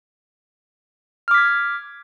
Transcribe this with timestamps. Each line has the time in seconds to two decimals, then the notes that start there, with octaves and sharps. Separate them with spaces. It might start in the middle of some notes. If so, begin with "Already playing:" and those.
1.28 F6
1.31 D6
1.34 B6
1.38 G#6